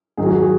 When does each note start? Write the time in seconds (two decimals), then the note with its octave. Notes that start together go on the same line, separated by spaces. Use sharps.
0.17 G#2 D#3 F#3 G#4
0.26 F#4
0.35 G#4